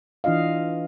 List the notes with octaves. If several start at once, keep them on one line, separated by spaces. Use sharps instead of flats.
E3 D4 F4 D#5 F5